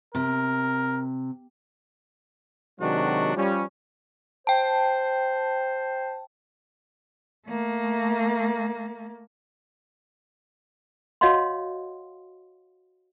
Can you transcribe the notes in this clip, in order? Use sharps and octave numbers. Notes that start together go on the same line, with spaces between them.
C3 A#4
C3 D#3 F#3 G#3 D4 F#4
F3 G3 C#4
C5 G5 A5
A3 A#3
F#4 C#5 D#5 F5 F#5 C6